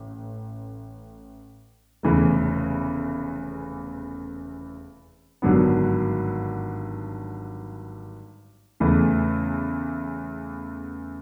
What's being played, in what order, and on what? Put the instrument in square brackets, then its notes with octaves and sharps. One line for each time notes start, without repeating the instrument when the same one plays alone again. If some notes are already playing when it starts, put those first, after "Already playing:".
Already playing: [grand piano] A1
F1 E2 C#3 E3 A3
G#1 G2 D3 F#3 B3
E2 C#3 E3 A3